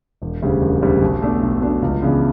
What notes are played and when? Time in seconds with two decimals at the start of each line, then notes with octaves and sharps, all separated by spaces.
0.22 E1
0.42 D2 C#3 G3
0.62 E1
0.82 D2 C#3 G3
1.02 B1
1.22 B2 A3 D4
1.42 B1
1.62 B2 A3 D4
1.82 C#2
2.02 C#3 E3 B3 D4